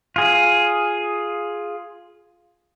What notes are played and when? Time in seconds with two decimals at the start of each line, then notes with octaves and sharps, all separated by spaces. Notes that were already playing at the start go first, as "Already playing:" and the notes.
0.16 F4 G#4